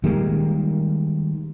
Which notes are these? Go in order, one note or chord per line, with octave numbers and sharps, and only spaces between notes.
D#3 G3 G#3 A#3